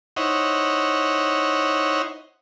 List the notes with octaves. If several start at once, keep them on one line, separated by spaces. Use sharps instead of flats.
D#4 E4 C5 C#5 D#5 F#5